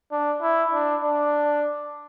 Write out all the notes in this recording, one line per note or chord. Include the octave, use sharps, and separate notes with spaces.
D4
E4
D4
D4